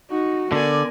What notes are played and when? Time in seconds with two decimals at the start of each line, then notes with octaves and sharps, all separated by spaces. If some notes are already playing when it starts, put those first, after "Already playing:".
0.11 D#4 F#4
0.52 D3 B3 A#4 D5 G#5